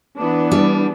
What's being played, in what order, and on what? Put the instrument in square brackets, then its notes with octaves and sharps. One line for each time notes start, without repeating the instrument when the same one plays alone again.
[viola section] E3 B3 D4
[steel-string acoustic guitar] G3